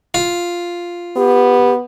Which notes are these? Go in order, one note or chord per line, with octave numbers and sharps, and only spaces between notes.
F4
B3 G4